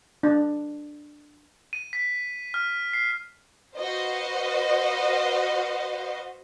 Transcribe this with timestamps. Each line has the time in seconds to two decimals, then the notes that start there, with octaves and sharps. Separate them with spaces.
0.23 D4
1.73 D#7
1.93 B6
2.54 F6
2.93 C7
3.76 F#4 B4 C5 D#5 F5